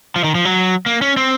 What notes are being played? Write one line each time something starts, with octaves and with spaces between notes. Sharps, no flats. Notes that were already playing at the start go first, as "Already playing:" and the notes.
F3
D#3
F3
F#3
A#3
C#4
C4